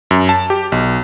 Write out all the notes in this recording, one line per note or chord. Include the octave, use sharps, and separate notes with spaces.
F#2
A5
G4
B1